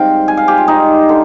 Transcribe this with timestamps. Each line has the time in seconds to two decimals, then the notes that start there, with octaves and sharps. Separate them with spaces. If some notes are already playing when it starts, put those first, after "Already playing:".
Already playing: G#2 G3 C4 F5 G5
0.28 G#5
0.37 F5
0.48 G4
0.58 F4
0.68 D#4
1.09 D3